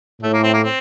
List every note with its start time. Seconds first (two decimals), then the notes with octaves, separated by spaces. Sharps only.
0.22 A2 A3
0.33 A#3
0.43 C4
0.54 A#3
0.64 C4